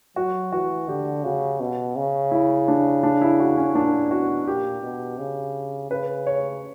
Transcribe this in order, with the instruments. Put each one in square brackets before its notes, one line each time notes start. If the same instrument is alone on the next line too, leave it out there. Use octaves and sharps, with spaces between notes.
[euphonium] F#3 [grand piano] F#4
[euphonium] E3 [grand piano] F#4
[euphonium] D3 [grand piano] G4
[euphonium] C#3 [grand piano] F#4
[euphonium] B2
C#3
[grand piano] E4
D4
D4
E4
F#4
C#4
[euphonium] A#2 [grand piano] D4
[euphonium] B2 [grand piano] F#4
[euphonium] A#2 [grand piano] G4
[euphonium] B2
C#3
[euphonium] C#3 [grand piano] B4
[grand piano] C#5